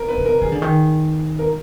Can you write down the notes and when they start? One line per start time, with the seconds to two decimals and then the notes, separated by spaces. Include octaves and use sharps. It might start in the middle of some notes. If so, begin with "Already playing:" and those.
Already playing: A#4
0.08 B4
0.17 D3
0.26 A#4
0.42 D#3 G#4
0.52 D3
0.62 D#3
1.39 A#4